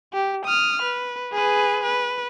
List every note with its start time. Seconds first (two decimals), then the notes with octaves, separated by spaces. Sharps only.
0.13 G4
0.45 D#6 F6
0.82 B4
1.33 G#4 B4
1.83 B4